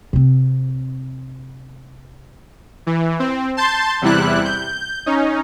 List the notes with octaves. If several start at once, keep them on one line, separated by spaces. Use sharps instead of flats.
C3 C4
E3
C4
A5 C6 G6 A6
E2 C3 G3 E4 F#6
G6
C#4 D#4